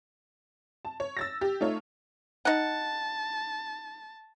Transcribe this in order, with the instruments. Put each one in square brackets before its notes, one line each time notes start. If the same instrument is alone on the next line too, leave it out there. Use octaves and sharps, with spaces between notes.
[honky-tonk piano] A5
C#5
E6 A6 A#6
G4
A3 D#4 F4 C#5
[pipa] D#4 F#5 [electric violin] A5